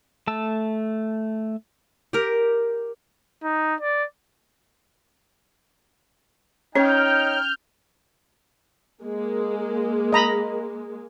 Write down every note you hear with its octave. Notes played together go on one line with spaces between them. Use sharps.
A3 A5 E6
G4 A#4
D#4
D5
C#4 D#4 C#5 G5 F6 G6
G#3 A#3
D#5 A#5 B5